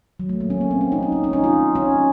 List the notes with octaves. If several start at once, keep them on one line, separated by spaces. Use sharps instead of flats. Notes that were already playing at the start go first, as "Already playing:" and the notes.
F#3
A3
A#3
C#4
A#3
C4
C#4
D#4
D#4
C#4
C#4
D#4
F4
C#4